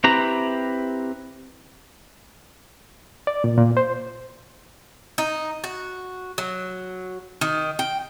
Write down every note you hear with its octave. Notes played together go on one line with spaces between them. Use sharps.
C4 E4 G4 B4 A#5
D5
A#2
A#2
C5
D#4
F#4
F#3
D#3
G5